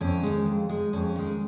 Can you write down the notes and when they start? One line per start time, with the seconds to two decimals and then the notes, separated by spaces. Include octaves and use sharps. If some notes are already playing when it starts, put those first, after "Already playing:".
0.01 F2 C#4
0.23 D#3 G#3
0.46 F2
0.69 D#3 G#3
0.93 F2 C#4
1.16 D#3 G#3